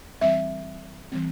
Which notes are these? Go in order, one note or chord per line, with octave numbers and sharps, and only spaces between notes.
E3 G3 C4 E5
E3 G3 C4